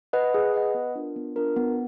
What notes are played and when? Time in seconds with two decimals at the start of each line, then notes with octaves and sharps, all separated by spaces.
0.13 B4 D#5 F#5
0.34 G#4
0.54 B4 D#5 F#5
0.74 B3
0.95 D4 F4 A#4
1.16 B3
1.36 D4 F4 A#4
1.56 B3